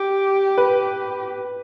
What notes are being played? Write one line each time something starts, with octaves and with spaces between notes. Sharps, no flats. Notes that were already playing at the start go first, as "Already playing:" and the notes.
Already playing: G4
B4